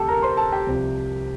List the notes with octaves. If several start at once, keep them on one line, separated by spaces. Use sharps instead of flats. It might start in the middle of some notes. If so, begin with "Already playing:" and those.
Already playing: D2 C3 G3 G4 A4 G5 A5
A#4 A#5
C5 C6
A4 A5
G4 G5
C2 C3 F3